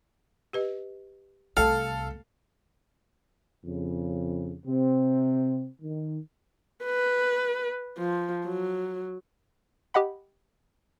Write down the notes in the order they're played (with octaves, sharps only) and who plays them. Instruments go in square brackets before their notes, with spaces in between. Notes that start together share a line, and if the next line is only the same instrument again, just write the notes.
[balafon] G4 B4 D#5
[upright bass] C2 C3 [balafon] A3 [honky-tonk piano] A4 [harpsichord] F5
[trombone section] F2 C#3
C3 C4
D#3
[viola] B4
F3
F#3
[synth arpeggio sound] G4 D#5 F#5 B5